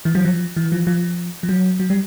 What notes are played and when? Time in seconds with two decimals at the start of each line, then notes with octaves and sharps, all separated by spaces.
0.05 E3
0.15 F#3
0.25 F3
0.57 E3
0.72 F3
0.87 F3
1.43 F3
1.49 F#3
1.80 F#3
1.90 G3